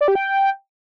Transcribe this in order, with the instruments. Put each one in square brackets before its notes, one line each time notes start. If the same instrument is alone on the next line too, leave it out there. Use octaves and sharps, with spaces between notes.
[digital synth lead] D5
G4
G5